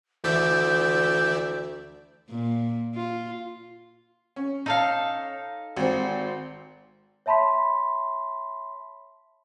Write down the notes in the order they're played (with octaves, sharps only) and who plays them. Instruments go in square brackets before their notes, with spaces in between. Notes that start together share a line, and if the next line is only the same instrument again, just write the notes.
[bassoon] D2 [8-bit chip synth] E3 D5 E5 [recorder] G6
[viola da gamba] A#2
F4
[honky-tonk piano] C#4
[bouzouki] D#4 A4 F5
[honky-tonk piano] G#1 C4
[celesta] C#5 E5 A5 B5 C6 B6